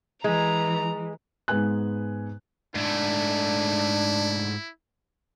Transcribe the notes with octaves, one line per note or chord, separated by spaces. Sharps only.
E3 G#3 A#5
G#2 G#3 B3 B4 G#5 F#6
G#2 A3 D4 E4